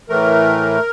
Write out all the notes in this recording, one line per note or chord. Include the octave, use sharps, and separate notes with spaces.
A2 E3 A3 A#4